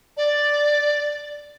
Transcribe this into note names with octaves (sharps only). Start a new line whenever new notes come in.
D5